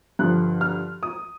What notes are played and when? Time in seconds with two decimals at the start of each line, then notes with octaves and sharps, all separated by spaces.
0.19 G2 D3 F3 F#6
0.61 F6
1.03 D#6